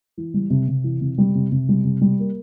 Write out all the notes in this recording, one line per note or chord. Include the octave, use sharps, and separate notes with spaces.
E3
G3
C3
C3
E3
C3
G3
C3
C3
G3
C3
G3
A#3